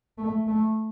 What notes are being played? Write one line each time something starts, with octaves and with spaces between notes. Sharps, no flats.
A3
A3